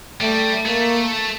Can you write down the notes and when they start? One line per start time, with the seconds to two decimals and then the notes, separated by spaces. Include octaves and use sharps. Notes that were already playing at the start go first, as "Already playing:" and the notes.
0.20 G3 A3
0.66 A3 A#3